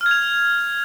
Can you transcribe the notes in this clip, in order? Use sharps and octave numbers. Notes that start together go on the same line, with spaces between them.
F6
G#6
F7